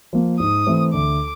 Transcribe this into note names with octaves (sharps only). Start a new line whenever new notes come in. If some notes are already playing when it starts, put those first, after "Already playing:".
F3 A#3
G#2 D#6
E3 A3 C4
D2 D6